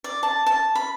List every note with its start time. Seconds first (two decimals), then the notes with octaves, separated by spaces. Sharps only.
0.04 D5
0.23 A5
0.46 A5
0.75 B5